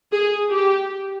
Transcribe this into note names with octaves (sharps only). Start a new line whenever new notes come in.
G#4
G4